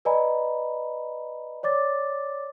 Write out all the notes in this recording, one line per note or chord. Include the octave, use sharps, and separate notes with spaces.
B4 D5 D#5 G#5 A#5 B5
C#5 D5 D6 A6